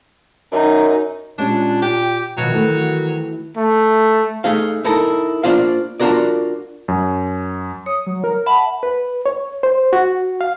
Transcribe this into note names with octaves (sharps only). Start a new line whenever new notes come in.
F#2 D#4
A#2 G#3 C#4 D4 G4
G4 G5
B2 D#3 F3 F#3
E3 A3 F#4
A3
A3 D#4 G#4 F5
D#4 E4 A4 A#4
A#3 D4 F4 C5 F5
D4 F4 F#4 A#4 D5
F#2
C#5 D#6
F#3
A#4
E5 F#5 A5 B5
B4
C#5
C5
F#4
F5